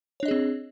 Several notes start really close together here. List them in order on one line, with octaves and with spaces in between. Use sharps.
C#5 D4 D#5 G#4 C4